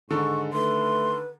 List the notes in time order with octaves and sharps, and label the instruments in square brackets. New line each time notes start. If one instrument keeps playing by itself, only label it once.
[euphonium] G#2 [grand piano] D3 D#3 A4 [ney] C#6
[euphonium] A3 [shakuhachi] B4 [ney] C6